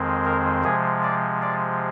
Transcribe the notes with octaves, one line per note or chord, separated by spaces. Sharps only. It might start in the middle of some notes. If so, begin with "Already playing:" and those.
Already playing: F2 D#3 G#3 C4
A#4
C3 F3 G#3 G#4
D5
D5